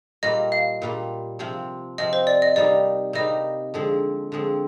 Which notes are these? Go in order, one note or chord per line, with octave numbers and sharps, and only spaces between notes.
A#2 G3 A#3 F4 D#5
F5
A#2 G3 A#3 F4
C3 F3 C4 F4
C3 F3 C4 F4 D#5
C5
D5
D#5
C3 G3 A#3 D#4 D5
C3 G3 A#3 D#4 D#5
D3 F3 G#3 C4
D3 F3 G#3 C4